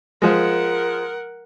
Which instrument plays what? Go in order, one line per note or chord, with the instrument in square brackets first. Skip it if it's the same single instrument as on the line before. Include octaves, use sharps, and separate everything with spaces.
[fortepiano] F3 G#3 [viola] A#4 F#5